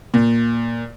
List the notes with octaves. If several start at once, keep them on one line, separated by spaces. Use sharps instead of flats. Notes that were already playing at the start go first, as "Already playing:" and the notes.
A#2